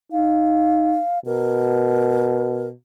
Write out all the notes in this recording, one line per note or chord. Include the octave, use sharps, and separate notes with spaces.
D#4 F5
B2 A#4